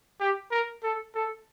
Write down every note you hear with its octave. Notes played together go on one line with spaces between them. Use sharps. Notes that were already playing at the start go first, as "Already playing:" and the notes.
G4
A#4
A4
A4